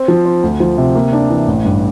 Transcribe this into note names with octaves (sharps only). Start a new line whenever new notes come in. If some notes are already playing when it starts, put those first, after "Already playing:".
Already playing: C4
F3
C4
D2
F3
C3
A#3
D4
E3
A1
G2